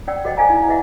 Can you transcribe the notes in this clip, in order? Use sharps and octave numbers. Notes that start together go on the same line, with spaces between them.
C#4 D5 F#5 G5 E6
F#4 A4 C5 D#5 F#5 G5
A4 C5 D5 F5 G#5 A#5
D#4 E4
G#4 B4 D#5 E5 F#5